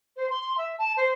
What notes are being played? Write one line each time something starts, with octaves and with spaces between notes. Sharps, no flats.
C5
C6
E5
A5
C5